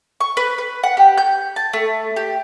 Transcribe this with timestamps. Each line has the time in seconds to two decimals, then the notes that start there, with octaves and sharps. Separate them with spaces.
0.20 C#6
0.37 B4
0.58 B4
0.83 F#5
0.97 G4
1.18 G6
1.56 A5
1.73 A3
2.16 G4